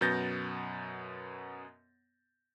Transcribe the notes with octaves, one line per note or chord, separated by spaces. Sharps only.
F#2 B2 B3 G6 A6 A#6